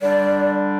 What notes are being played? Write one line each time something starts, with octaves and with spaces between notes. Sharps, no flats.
D3 G3 D4 D5